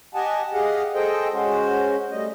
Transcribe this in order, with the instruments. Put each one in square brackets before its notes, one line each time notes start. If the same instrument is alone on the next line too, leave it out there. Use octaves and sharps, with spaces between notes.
[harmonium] G4 D#5 F#5 G#5 A5
G4 G#4 D#5 F5 F#5
G#4 A4 C5 D#5 G5
G#3 C#4 F#4 C5
G3 A3 D#5